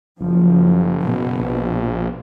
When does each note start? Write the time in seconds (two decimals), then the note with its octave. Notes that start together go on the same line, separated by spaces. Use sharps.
0.21 F#1 F3
1.07 B2
1.39 A#1